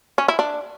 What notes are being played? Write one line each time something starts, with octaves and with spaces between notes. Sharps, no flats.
C#4
E4
D4